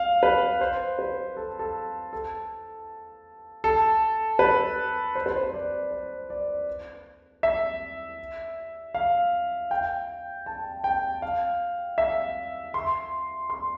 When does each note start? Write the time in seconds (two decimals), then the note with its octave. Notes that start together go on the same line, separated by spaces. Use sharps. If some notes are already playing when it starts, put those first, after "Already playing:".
Already playing: F5
0.23 B4
0.61 C5
0.99 B4
1.37 A4
1.59 A4
2.13 A4
3.64 A4
4.39 B4
5.15 C5
5.26 B4
5.36 C5
5.47 C5
5.54 D5
5.91 C5
6.30 D5
7.43 E5
8.94 F5
9.71 G5
10.46 A5
10.84 G5
11.22 F5
11.98 E5
12.74 C6
13.50 C6